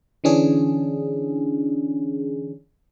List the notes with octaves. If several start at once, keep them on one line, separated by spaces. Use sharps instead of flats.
D3 E3 C#4 D4 G#4